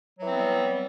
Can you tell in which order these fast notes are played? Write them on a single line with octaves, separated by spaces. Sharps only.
F#3 E3 C4 B3 G3